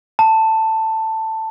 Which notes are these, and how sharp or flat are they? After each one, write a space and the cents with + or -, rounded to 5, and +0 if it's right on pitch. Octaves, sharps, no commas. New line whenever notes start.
A5 +10